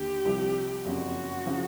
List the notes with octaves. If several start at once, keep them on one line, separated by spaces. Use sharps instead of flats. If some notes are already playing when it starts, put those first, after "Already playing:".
Already playing: D#2 D3 G4
C2 C3 F3
F#1 F2 C#3 F#4
C#3 F3